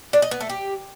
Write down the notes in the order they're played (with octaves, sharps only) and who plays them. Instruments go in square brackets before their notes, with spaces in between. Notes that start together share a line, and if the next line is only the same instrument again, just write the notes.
[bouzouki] D4
D#5
B3
A3
G4